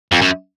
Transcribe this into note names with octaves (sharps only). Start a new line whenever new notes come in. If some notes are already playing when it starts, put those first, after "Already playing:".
F2
F#2